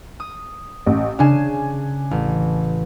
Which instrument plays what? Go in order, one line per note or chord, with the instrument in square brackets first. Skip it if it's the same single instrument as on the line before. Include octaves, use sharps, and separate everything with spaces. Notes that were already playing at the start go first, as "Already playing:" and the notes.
[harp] D#6
[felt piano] A1
[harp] C#3 C7 E7 [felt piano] D4 G#5
[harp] A1